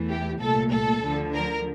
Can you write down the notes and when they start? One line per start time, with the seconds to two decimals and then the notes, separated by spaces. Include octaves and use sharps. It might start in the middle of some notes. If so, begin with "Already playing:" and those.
Already playing: E2 E3 A3
0.10 G4
0.40 C2 A#2 A3 A4
0.70 A4
1.02 D2 D3 F3
1.33 A#4